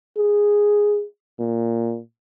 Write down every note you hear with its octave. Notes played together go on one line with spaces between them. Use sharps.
G#4
A#2